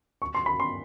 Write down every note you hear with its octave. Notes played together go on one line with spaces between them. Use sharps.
C#6
C6
B5
C6